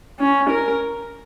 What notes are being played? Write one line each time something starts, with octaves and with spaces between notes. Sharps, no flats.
C#4
A#4